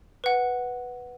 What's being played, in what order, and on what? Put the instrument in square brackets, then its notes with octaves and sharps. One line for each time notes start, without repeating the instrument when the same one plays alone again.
[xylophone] B4 F#5